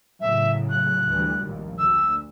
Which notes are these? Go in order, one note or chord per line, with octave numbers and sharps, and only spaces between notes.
A2 C#3 F#3 E5
F#6
D2 E3 G3
A#1 D#2
D2 E6